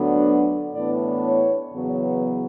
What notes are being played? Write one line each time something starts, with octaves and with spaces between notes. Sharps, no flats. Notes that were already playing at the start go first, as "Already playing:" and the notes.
Already playing: D2 D3 F#3 B3 D4
A2 E3 B3 D4 D5
C#5
E2 C#3 F#3 B3